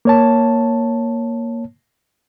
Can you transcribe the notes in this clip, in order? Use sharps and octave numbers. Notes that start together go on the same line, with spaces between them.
A#3 C#5 A5